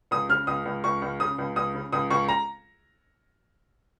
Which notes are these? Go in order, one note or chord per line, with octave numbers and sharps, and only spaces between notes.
C#2 D#6
C#3 F6
C#2 D#6
C#2
C#2 C#6
C#2
C#3 D#6
C#2
C#2 D#6
C#3
C#2 D#6
C#2 C#6
A#5